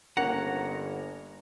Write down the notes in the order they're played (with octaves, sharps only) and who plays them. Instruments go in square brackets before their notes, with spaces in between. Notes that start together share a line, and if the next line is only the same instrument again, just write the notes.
[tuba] G1 [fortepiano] A#3 C#4 [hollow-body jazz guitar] F#5 [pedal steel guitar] A#5